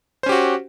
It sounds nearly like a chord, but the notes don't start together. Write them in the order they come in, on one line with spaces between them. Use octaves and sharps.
C5 C#4 G4 F#4